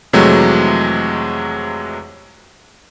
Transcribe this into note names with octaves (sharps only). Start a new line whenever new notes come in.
F2 C3 E3 F#3 G#3 A3